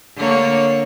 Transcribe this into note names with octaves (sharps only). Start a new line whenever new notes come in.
D3 A#3 C#5